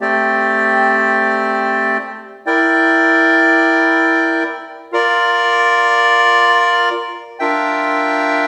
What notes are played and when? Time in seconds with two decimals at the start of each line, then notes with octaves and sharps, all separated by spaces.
0.01 A3 C4 G4 D5 G5
2.46 E4 A#4 D5 G5
4.92 F4 A#4 D5
7.39 D4 F4 A#4 E5 G5